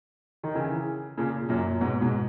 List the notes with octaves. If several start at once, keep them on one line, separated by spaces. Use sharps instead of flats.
D#3
C#3 E3
A#2 C#3
F#2 A#2
G#2 B2
G#2 B2